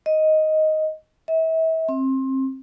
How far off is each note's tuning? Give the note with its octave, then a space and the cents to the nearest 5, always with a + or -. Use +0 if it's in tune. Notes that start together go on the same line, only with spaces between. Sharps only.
D#5 +5
E5 -35
C4 +25